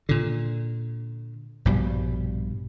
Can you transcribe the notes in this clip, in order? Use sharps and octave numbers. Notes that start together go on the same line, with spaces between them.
A#2 D3
A#1 G2 B2 G3